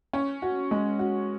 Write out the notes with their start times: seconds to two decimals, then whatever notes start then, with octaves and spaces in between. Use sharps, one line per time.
0.13 C#4
0.42 F#4
0.71 G#3
0.99 F#4